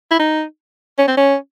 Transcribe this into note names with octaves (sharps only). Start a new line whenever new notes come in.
E4
D#4
C#4
C4
C#4